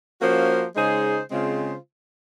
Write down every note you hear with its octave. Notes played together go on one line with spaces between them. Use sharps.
F3 A#3 C#4 F#4 C5
C#3 G#3 D#4 G#4 C5
C#3 G#3 C4 F4 C5